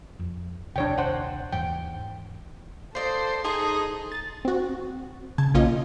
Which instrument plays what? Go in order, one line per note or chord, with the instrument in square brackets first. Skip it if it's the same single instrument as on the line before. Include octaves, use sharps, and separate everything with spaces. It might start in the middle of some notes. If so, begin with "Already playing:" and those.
[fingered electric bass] F2
[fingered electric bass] A#1 D#2 C3 [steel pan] D4 C#5 G5
[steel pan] C5 F#5
[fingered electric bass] D#2 G#2 E3 [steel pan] G5
[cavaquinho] F4 D5 D#5 [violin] A4 [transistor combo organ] C5
[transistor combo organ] D#4 [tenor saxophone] G#4 [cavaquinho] A5 C6
[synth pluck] A6
C4 F#4
C#3 A5 G#6
B1 A#3 C#4 F4 D#5